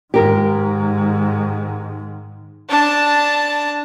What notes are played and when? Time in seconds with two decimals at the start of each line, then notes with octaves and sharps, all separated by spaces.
0.14 G#2 D#3 G4 A#4
2.69 D4 A5